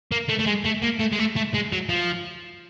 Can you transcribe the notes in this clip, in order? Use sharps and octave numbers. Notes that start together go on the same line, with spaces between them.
A#3
A3
A3
G#3
A3
A#3
A3
G#3
A3
A3
G#3
F#3
F3